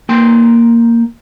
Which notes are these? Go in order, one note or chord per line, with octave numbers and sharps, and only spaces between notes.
A#3 G5 C6